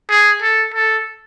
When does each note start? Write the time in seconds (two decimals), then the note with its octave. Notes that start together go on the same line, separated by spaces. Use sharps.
0.09 G#4
0.42 A4
0.74 A4